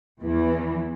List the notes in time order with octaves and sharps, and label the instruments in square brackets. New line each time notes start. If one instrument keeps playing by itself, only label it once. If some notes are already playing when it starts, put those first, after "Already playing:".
[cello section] E2 E3